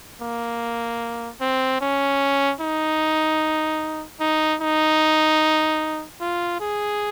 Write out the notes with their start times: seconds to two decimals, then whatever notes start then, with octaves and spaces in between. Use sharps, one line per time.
0.22 A#3
1.41 C4
1.81 C#4
2.61 D#4
4.20 D#4
4.61 D#4
6.21 F4
6.60 G#4